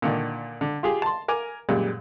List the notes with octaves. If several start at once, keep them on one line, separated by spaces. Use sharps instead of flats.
A#2 D3 D#3
D3
F4 G4 G#4
A5 C6
A#4 G#5 D6
F#2 A#2 G3 G#3